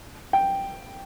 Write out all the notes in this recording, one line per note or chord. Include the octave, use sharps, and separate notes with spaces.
G5